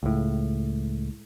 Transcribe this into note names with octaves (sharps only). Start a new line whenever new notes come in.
C#2 A2